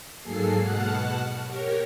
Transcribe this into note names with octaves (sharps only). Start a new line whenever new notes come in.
G#2 F#3 A#3 G#4 A4 C7
B2 F#5 A5 F6 F#6
G4 A#4 C#5